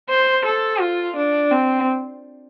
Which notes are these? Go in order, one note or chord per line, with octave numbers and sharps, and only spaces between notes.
C5
A4
F4
D4
C4